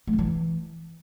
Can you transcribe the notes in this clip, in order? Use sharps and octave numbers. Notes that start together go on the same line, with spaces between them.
A3
D3
E3